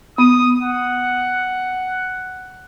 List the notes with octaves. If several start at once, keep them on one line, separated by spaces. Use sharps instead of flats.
B3 D#6
F#5